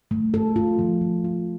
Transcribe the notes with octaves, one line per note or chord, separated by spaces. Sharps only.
A3
A4
F4
F3
F3
F4